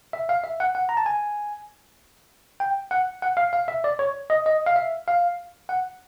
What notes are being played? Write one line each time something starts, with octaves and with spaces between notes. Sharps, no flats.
E5
F5
E5
F#5
F#5
A#5
A5
G#5
G5
F#5
F#5
F5
F5
E5
D5
C#5
D#5
D#5
F5
E5
F5
F#5